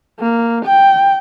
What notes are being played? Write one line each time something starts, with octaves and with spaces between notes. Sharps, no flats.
A#3
G5